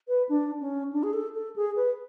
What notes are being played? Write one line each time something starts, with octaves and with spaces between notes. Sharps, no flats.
B4
D4
C#4
D4
G#4
A4
A4
G#4
B4